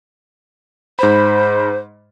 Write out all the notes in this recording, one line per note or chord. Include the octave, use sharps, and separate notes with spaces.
G#2 C5 B5